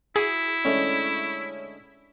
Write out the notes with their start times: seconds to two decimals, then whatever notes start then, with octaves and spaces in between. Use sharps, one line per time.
0.16 E4 F#4 G#4
0.65 D3 G#3 A3 C#4